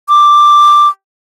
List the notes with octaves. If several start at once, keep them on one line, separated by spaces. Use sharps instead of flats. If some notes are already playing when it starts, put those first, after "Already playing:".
D6